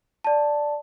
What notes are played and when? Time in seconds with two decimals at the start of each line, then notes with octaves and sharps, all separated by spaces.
0.24 D5 A5